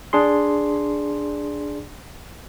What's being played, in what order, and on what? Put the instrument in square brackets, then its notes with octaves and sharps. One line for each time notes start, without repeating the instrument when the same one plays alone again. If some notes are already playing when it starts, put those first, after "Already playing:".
[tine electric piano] D4 G#4 C6